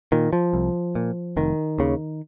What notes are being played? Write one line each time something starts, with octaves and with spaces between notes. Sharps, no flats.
A#2 D#3
F3
C2
A#2
F1 D#3
D#2 C#3